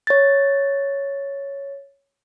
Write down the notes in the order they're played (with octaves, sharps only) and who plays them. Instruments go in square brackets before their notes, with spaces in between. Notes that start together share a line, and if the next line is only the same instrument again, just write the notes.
[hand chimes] C#5 A6